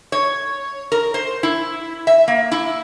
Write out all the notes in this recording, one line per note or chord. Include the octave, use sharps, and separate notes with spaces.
C#5
A#4
C5
E4
E5
A#3
E4